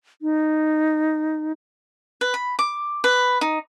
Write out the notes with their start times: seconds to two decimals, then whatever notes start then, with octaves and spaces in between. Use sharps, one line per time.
0.22 D#4
2.21 B4
2.34 B5
2.59 D6
3.04 B4
3.41 D#4